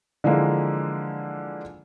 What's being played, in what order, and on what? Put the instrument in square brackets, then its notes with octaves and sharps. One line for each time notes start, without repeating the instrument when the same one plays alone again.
[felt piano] D3 E3 F3 G#3 A#3